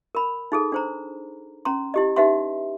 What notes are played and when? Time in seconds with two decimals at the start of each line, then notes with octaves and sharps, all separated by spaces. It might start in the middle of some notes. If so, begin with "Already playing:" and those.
0.15 A#4 B5
0.52 D#4 G#4 A4
0.72 D4 C5 A#5
1.65 C#4 A#5 C6
1.94 E4 G4 D#5
2.16 D#4 G4 B4 E5 F#5 C6